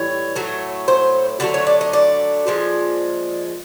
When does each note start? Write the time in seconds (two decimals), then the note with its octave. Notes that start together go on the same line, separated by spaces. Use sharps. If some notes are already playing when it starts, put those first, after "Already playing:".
Already playing: A2 E3 G3 C#5
0.36 A2 F#3 A3
0.88 C5
1.40 D3 F#3 A3 B4
1.54 C#5
1.67 D5
1.81 D#5
1.93 D5
2.47 A#2 F3 G#3